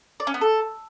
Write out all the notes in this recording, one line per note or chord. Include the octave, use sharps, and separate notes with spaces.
D5
C#4
B3
A4